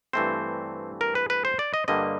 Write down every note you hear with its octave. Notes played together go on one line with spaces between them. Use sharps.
G2 E3 A3 C4 C5
A#4
B4
B4
C5
D5
D#5
G2 D3 G3 A#3 D#5